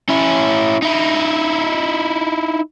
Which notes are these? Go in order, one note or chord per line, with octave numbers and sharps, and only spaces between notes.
C#4 E4
D#4 E4